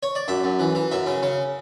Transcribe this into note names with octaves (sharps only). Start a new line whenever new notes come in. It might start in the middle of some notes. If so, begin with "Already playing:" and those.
C#5
D5
F#2 E5
F#2
E3
E3
F#2 E5
C#3
C#3